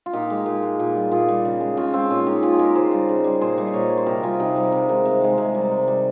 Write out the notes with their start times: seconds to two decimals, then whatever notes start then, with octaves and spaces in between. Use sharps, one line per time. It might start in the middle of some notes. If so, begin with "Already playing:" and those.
0.06 F4
0.13 A#2 D#4 G4
0.30 G#3
0.46 A#2
0.63 G#3
0.79 A#2
0.95 G3
1.11 A#2 F4 G#4
1.28 G3
1.45 C#3
1.61 G#3
1.77 C#3 C#4 F4
1.93 G#3 C4 D#4
2.10 A#2 C#4 F4
2.26 G#3 D#4 G4
2.42 A#2 F4 G#4
2.54 G#4
2.59 G#3 G4 A#4
2.75 C#3 G#4 C5
2.91 G3
3.09 C#3
3.24 G3
3.41 A#2 G#4 C5
3.58 G3
3.67 D#5
3.73 A#2 A#4 C#5
3.88 G3 C#5
3.98 C5
4.06 C3 G4 A#4
4.17 A#4
4.23 G3 F4 G#4
4.40 C3 D#4 G4
4.56 G3
4.72 C3
4.89 D#3 G#3
5.05 C3
5.22 D#3 G#3
5.38 C3
5.55 G3
5.71 C3
5.88 G3